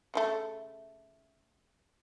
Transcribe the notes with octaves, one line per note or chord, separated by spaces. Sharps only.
C#3 F3 A3